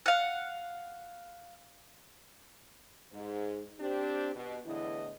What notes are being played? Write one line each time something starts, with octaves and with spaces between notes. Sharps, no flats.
F5 F#5
G#2
C4 D4 G4
B2
E2 A2 D3 E3 E4 D#5